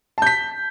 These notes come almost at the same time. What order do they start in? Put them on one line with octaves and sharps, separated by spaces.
A5 G6 B6